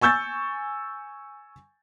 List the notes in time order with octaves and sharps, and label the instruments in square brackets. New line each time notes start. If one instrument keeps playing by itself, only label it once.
[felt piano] G#5 C#6 E6 G6 A6